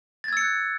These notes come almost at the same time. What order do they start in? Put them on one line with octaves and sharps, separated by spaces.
A6 G#6 E6 C#7 F#6